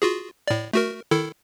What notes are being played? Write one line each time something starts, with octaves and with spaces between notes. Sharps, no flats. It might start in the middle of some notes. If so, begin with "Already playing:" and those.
F4 F#4 G#4
A2 D5
A3 F#4 A#4
D#3 E4 A4